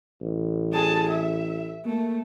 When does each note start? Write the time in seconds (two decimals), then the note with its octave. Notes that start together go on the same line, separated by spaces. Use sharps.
0.21 A1
0.73 G#4 A5
1.10 E5
1.86 A3 A#3